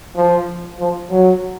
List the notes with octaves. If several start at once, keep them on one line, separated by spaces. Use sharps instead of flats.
F3
F3
F#3